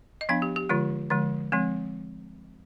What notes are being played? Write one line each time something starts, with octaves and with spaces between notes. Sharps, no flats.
D#5
F3 B3 D4 F5
G4
G4
D3 F3 G#3 F4
D3 F3 G#3
F3 G#3 C4